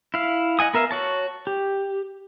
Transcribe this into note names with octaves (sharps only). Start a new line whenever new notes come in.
E4 F5
D#5 F#5 G#5 D#6
B3 A#4 E5 F5
F#4 C#5 A5
G4